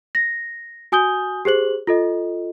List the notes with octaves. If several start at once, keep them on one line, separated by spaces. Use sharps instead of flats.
A#6
F#4 G#5 D#6 G6 G7
G4 G#4 C5 F#7
F4 A4 D#5